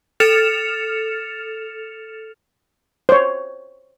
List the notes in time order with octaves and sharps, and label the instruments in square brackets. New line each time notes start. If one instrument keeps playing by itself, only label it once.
[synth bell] A4 F6 A6 C#7 E7 F7
[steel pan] C5 C#5